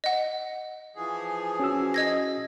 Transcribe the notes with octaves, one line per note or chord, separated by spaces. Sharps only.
D#5 F#5
E3 F3 G#4
C#4 F#4 E6
D#5 G#6 A#6